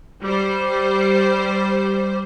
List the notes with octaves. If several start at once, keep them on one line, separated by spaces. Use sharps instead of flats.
G3 C5